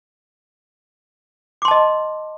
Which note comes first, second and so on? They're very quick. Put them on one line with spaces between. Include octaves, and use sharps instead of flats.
D6 C6 A5 D#5